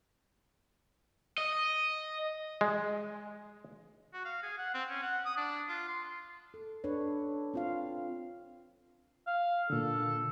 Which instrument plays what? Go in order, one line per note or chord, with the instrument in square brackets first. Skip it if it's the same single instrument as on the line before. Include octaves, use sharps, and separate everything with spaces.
[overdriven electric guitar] D#5
[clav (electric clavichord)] G#3
[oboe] F#4
F5
G#4
F#5
C4
C#4
F#5
D#6
D4
F4
C6
[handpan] A4
D4 A4 B4 C#5
C4 F4 F5
[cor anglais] F5
[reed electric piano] A#2 D3 [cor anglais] A4